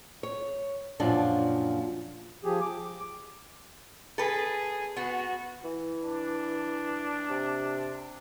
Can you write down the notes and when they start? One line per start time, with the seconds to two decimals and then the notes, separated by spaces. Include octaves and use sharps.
0.23 C#5
1.00 F#2 A#2 F3 D4
2.44 F3 G4 G#4
2.61 D6
4.18 G#4 A4 B4
4.96 B3 F#4
5.64 E3
6.04 D4
7.30 C3